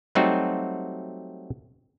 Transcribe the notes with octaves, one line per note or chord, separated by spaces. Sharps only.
F#3 G3 A3 C4 D#4 F#4